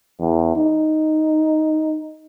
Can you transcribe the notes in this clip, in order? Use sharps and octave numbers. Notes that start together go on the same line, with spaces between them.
E2
D#4